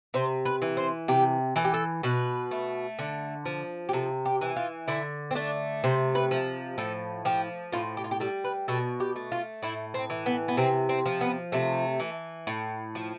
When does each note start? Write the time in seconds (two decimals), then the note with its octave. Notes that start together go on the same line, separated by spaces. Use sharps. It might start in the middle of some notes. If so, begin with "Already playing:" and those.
0.14 C3 C5
0.45 B4
0.62 E3
0.77 C5
1.08 C3 G4
1.56 E3 A4
1.65 G4
1.74 A4
2.03 B2 B4
2.51 A3
2.99 D3
3.46 F3
3.89 G4
3.93 C3 A4
4.26 G4
4.41 E3
4.56 F4
4.88 D3 E4
5.31 C4
5.35 A3 D4
5.84 C3 C5
6.15 B4
6.31 F3
6.78 A2 A4
7.25 F3 G4
7.72 A2 F4
7.97 G4
8.04 F4
8.11 G4
8.20 G3 A4
8.44 B4
8.68 B2 A4
9.00 G4
9.16 A3
9.32 F4
9.63 A2 E4
9.94 C4
10.10 E3
10.26 B3
10.48 B3
10.57 C3 C4
10.89 C4
11.06 F3
11.21 B3
11.52 C3 A3
12.00 E3
12.47 A2
12.95 F3